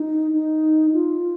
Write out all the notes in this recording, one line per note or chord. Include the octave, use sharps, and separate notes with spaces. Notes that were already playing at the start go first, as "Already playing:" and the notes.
Already playing: D#4
D#4
F4